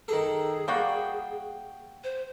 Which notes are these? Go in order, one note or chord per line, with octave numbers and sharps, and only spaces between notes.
D#3 G#4 A4
G3 A#3 F#4 G5
C5